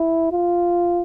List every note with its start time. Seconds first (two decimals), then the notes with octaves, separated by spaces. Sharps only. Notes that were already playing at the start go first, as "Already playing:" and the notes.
Already playing: E4
0.32 F4